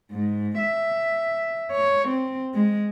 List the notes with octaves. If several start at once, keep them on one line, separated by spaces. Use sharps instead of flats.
G#2
E5
C#5
C4
G#3